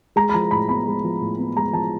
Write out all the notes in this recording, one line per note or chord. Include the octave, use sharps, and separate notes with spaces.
G#3 A#5
B5
F3 A#5
A2 B5
B3 B5
G#3
F3
A2
B3
G#3 A#5
F3 A5